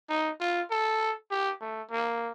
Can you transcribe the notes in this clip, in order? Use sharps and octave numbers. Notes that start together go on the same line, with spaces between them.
D#4
F4
A4
G4
A3
A#3